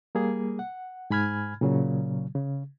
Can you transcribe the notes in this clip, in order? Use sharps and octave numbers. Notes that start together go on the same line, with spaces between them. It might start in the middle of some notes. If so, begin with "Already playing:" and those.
G3 A#3 G#4
F#5
G#2 G#5 B5 F6 G#6
A#2 C#3 F#3
C#3